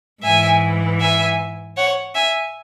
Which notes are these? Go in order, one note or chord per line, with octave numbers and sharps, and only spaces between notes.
G#2 E3 E5 G#5
E5 G#5
C#5 F#5
E5 G#5